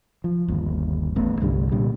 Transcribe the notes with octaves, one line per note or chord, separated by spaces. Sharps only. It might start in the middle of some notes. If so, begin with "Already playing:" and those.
F3
G1 D#2
A1 A3 B3
C2 G2 D3 G3
A#2 D3 G3